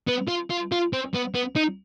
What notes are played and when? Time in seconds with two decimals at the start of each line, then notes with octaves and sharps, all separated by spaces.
0.08 B3
0.28 F4
0.50 F4
0.72 F4
0.93 C4
1.15 B3
1.35 B3
1.56 D#4